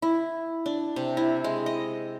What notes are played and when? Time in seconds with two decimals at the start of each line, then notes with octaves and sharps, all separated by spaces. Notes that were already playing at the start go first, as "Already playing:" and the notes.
0.02 E4
0.66 D4
0.96 C3
1.17 E4
1.44 G#3
1.66 D#5